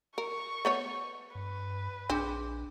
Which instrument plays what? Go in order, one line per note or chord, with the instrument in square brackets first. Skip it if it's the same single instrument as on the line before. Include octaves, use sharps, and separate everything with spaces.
[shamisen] A#4 [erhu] C#6
[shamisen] A3 B3 C#5
[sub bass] G2 [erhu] B4
[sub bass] A#1 [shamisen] C4 [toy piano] D4 G#4